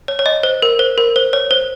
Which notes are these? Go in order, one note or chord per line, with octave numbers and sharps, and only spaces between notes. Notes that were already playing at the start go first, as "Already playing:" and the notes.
C#5
C#5
D#5
C5
A#4
C5
A#4
C5
C#5
C5